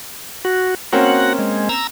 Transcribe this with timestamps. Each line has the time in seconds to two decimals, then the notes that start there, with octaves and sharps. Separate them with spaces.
0.45 F#4
0.93 A#3 C4 C#4 F#4 F#5
1.39 G#3
1.69 A#5 E6